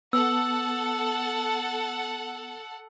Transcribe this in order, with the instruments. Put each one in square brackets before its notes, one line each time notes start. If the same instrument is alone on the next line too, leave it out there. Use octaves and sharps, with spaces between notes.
[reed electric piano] B3 [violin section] A4 F#5 [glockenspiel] E6